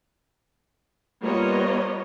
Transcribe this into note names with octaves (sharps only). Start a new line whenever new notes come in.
G3 A#3 B3 F4 C#5 D#5